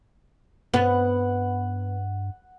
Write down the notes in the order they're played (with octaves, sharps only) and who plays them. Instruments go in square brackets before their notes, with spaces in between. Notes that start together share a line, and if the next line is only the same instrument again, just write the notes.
[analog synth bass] G2 [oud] B3 [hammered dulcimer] F#5